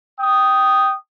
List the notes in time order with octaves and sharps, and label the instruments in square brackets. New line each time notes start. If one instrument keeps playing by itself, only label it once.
[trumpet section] G5 D#6